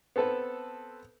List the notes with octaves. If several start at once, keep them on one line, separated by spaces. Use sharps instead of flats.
B3 C4 A4 B4